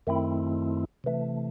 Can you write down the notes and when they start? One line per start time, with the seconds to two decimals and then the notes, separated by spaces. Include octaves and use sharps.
0.07 F#2 D#3 A3 C4 E4
1.04 C3 E3 A3